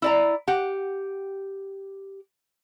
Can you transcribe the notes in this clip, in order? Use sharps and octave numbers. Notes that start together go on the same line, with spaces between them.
E4 D5 A#5
G4 F#5